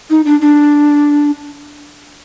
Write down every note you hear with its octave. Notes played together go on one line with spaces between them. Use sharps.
D#4
D4
D4